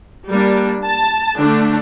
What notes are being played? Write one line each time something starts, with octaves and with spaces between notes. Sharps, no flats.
G3 A#3 D4
A5
D3 A3 D4